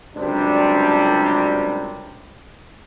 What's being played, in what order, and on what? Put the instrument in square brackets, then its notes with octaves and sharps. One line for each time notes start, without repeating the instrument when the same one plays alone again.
[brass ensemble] C#2 F#2 C3 G3 D4